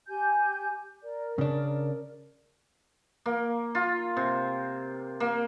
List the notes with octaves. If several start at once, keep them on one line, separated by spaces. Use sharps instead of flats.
G4 G#5 G6
A#4 D5
C#3 D4
A#3
F4
C3
A#3